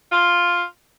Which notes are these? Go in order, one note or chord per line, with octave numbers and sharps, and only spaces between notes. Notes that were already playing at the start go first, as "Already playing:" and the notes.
F4